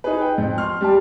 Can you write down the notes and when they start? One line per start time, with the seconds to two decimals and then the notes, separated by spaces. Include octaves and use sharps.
0.04 D#4 G#4 B4
0.21 G5
0.38 F2
0.58 C6 F6
0.81 G3 G4 A5